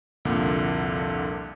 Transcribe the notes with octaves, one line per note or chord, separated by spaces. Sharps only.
C2 F2 A#2 D3 A#3